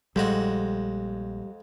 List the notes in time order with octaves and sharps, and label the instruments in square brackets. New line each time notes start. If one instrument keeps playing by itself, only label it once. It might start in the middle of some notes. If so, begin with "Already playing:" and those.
[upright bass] A#1 [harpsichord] F2 G#3 F#4 [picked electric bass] G3